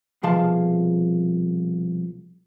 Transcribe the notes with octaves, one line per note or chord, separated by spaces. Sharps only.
C2 B2 F3 G#4 F5 A5